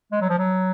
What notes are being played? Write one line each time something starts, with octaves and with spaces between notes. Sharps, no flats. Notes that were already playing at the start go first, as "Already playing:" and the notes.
G#3
F#3
F3
F#3